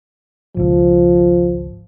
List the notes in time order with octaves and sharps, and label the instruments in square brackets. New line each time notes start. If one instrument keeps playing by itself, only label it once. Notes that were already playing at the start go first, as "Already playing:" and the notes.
[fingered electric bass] G#1 C#2 [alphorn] F3